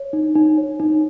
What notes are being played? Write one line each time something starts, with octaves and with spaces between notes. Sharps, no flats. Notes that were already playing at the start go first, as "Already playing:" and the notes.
Already playing: C#5
D#4
D#4
C#5
D#4